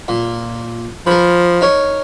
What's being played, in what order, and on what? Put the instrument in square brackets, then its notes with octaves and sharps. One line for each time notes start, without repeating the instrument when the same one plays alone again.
[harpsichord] A#2
[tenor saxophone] F3 [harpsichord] A#4 B4
[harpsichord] D#4 A#4 C#5